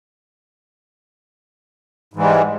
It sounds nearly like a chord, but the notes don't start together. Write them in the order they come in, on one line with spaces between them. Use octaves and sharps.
G#2 E3 G3 G#3